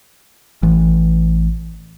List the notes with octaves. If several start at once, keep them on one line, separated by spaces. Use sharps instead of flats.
A1 E3